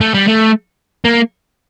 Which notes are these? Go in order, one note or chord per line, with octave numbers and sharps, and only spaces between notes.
A3
G3
A3
A#3